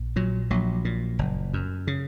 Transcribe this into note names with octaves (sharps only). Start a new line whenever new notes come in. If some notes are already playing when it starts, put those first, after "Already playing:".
Already playing: A#1
A#2 F#3
A#1 F#3
A#2
F#1
F#2
C#3